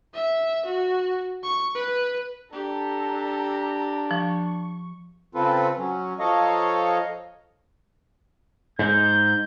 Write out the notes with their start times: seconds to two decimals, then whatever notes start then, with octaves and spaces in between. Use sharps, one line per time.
0.14 E5
0.65 F#4
1.43 C#6
1.75 B4
2.53 D4 G4 A4 A#5
3.09 D4
4.11 F3 C#6
5.35 C#3 C4 F4 A4 B4
5.78 F#3 C#4
6.19 F3 A4 C#5 D#5 F5 A#5
8.79 G#2 G6